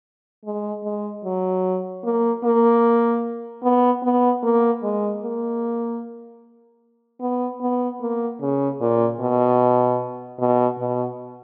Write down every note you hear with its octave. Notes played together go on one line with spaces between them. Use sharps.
G#3
G#3
F#3
A#3
A#3
B3
B3
A#3
G#3
A#3
B3
B3
A#3
C#3
A#2
B2
B2
B2